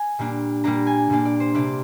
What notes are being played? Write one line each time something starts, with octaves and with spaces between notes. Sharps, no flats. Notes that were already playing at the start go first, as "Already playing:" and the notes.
Already playing: G#5
A#2 G3 A#3 D4
A#2 G3 A#3 D4 A#5
G#5
A#2 G3 A#3 D4
D5
C5
C3 G3 A#3 D4 D5